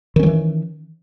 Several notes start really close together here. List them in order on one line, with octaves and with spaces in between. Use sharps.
D#3 C#4 F#3 E3